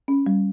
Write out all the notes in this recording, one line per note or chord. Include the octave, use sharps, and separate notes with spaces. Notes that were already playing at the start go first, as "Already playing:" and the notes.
C#4
G3